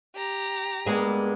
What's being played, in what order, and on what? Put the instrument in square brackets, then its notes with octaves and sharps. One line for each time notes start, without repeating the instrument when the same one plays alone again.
[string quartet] G4 A#5
[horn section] G2 A#3 B3 [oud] G#3 G#4